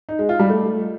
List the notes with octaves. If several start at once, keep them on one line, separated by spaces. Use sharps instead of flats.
D#4
G#3
F4
G3
A3